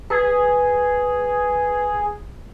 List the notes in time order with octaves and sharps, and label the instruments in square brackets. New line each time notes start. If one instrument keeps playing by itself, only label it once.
[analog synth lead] G#4 [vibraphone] B4